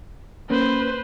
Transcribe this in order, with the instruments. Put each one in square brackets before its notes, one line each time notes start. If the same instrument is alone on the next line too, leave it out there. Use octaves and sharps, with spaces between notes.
[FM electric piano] A#3 C#4 [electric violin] B4 C5